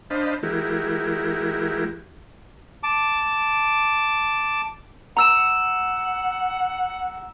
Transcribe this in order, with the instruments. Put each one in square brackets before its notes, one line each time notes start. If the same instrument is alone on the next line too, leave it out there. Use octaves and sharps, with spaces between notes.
[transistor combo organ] D4 C5 D#5 F5 A5 B5
E3 G#3 E4 F#4 G4 A#4
[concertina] A5 D6
[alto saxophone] F#5 [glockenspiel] A#5 E6 E7